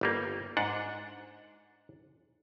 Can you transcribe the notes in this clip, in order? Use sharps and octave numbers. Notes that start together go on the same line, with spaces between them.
G1 G3 A#3
G#2 D4 F#5